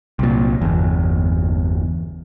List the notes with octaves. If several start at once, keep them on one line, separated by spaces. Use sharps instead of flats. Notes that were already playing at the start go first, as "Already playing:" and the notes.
C2 A#2
G1 E2